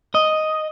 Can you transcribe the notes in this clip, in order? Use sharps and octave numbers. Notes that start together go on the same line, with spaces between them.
D#5